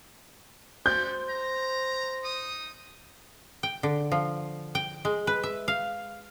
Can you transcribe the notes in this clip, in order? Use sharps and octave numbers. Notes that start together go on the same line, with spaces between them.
G3 F#4 C5 D5 G6
A#5
D#4 D#6
G5
D3
F3
G5
G#3
B4
E5
F5